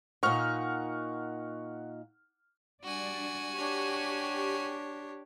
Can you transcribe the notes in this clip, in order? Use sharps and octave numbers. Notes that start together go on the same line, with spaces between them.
A#2 D#4 F#5 C#6 F6
G3 D4 F#4 D5 G#5
D4 G4 C#5